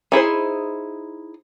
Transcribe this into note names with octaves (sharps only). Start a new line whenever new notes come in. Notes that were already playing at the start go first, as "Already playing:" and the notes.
D#4 E4 G#4 C5